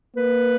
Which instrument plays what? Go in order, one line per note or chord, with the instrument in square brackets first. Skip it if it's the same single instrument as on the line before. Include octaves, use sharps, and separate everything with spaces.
[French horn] A#3 [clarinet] B4